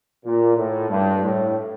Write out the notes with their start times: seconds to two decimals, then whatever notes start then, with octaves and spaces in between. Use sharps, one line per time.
0.25 A#2
0.57 A2
0.89 G2
1.22 A2